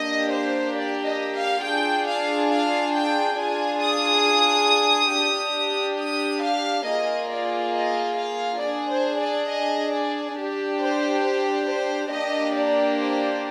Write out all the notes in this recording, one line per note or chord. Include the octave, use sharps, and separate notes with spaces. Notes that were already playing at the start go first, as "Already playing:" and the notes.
Already playing: A#3 D4 G4 D#5
C5
D5
D#5
F5
D4 F4 G#4 G5
F5
F5
G5
D4 F4 G#4 G#5
D#6
D4 G4
D#6
F5
A#3 F4 G#4 D#5
D5
D#5
F5
D4 G#4 D5
C5
D5
D#5
D5
D4 G4
C5
C5
C5
A#3 D4 G4 D#5
D5
C5